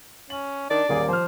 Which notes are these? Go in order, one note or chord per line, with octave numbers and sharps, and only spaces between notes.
C#4 F#7
D#3 D4 D5
D#1 A#3 G#4 D6
F3 C5 F6